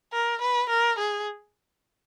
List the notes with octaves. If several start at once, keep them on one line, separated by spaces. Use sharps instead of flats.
A#4
B4
A#4
G#4